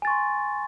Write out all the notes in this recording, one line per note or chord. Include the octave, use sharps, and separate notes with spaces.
G#5 C6 C#6 A6